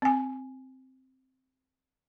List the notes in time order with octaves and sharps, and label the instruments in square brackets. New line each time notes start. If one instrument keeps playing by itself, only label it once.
[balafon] C4 G#5